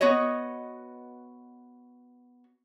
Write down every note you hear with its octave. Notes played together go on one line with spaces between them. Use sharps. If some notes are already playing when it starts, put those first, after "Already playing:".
B3 F#4 C#5 D#5